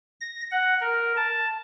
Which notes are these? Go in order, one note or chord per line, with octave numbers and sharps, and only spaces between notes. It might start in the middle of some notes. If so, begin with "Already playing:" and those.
A#6
F#5
A#4
A5